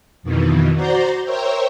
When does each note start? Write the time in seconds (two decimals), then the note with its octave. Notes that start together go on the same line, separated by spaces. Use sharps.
0.23 F2 B2 D#3 E3
0.74 F#4 C5 D5 A#5 C6 G6
1.25 A#4 C5 C#5 E5 G5